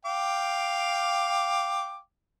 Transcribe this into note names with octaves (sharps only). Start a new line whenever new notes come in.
F5 G5 D6